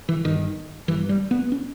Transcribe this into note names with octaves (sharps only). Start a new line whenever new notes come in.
E3
G1 G2 D#3
G1 G2 E3
G3
B3
C#4